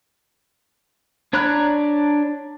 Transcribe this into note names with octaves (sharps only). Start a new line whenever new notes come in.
D4 C#5 A#5 B5 F#6